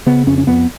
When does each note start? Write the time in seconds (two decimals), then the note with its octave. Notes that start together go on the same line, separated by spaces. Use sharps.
0.06 C#3 B3
0.27 F2 C#4
0.38 C#4
0.47 F2 B3